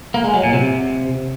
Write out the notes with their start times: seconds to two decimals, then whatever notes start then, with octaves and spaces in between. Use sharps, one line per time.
0.14 A#3
0.24 G#3
0.34 F#3
0.43 A#2
0.53 C3